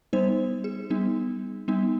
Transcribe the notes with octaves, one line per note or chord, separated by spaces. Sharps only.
G3 B3 D#4 C5
G#4
G3 B3 D#4
G3 B3 D#4